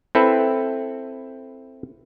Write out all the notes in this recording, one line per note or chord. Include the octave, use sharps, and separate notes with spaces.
C4 E4 A4 B4